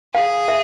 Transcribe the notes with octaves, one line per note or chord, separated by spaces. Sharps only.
G#4 F5
E5